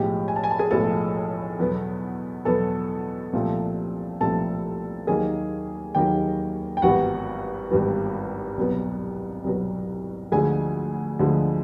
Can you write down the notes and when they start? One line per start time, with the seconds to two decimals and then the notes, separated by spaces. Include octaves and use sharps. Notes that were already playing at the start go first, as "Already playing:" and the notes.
Already playing: B1 A2 F3 G#3 G4 G5
0.28 G#5
0.36 A5
0.44 G#5
0.51 A5
0.59 G#4 G#5
0.71 B1 A2 F3 G#3 A4 A5
1.59 E2 B2 F#3 B3
2.45 E2 B2 F#3 B3 A4 A5
3.33 C2 A#2 F3 A3 C4
4.20 C2 A#2 F3 A3 C4 A4 A5
5.07 D#2 D#3 F#3 A#3 G#4 G#5
5.95 D#2 D#3 F#3 A#3 G4 G5
6.77 G5
6.82 G#1 G2 E3 G3 B3 F#4 F#5
7.70 G#1 G2 E3 G3 B3
8.57 C2 B2 F#3 B3
9.44 C2 B2 F#3 B3
10.32 D2 D3 F3 G#3 G#4 G#5
11.19 D2 D3 F3 G#3